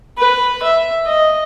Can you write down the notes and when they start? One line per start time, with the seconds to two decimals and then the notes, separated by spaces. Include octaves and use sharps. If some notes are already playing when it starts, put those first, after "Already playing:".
0.18 B4
0.63 E5
1.06 D#5